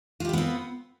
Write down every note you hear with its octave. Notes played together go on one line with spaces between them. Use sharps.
B3 C4 F4 G4 B4